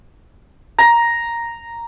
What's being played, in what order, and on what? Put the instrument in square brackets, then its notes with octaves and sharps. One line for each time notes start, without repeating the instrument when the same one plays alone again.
[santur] A#5